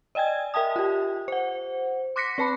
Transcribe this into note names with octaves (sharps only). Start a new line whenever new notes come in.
D5 D#5 G5 G#5 G#6
A#4 E5 G5 A5 D#6
F4 G4
C5 F#5
C6 D6 F#6 A#6 B6 C#7
C4 B4 A5 B5